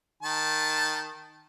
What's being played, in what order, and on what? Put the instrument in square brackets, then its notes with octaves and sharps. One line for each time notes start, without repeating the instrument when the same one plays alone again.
[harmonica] D#3 A5